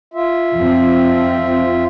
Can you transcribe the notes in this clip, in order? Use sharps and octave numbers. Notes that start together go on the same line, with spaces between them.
F4 E5
F2 F3 C4